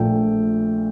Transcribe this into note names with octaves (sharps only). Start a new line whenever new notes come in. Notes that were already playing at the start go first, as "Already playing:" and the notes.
Already playing: A#1 A#2 A3 G5